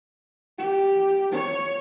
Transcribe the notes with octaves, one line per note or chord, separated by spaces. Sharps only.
G4
C#5